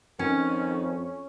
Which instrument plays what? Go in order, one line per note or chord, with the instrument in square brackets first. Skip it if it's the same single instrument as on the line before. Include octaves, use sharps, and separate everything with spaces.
[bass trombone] F2 [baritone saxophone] D#3 [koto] C#4